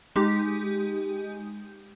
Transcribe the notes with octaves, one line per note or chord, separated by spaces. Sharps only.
G#3 D#4 G4